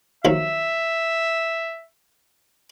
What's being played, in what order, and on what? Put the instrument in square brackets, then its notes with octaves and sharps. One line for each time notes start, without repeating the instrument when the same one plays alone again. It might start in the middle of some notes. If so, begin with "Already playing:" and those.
[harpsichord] D#2 F3 F#3 [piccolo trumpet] E5